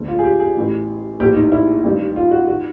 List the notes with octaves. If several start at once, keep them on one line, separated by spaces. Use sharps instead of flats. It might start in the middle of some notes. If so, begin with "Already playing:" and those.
Already playing: E1 D2 D3
F4
G#4
G4
G#4
A1 A2 E3
A#1 A2 E3 G4
D#4
E4
A1 G2 D#3
F4
F#4
F#4
D#3